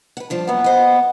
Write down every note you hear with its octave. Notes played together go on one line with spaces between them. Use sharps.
B4 F#5
G2 F3 D4
F#2 A#2 B3
C5 D#5